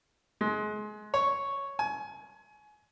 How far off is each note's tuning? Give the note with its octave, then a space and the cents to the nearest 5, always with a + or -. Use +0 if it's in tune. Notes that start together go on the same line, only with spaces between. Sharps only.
G#3 +30
C#5 +0
G#5 +25